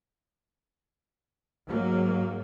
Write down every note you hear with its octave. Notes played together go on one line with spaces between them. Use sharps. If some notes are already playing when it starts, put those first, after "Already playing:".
G#2 F#3 A#3